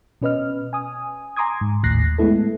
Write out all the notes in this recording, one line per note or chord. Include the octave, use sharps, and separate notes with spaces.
B2 C#4 B4 D#5 F6
G#5 D#6
G#5 A#5 C6 D6 D#6 G#6
G#2
A1 D#2 A2 F#6 A#6 C7
G#3 A3 B3 E4 A4